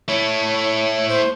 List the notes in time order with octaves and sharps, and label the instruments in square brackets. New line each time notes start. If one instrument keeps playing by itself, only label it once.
[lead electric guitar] A3 E4 [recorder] C#5
[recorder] C5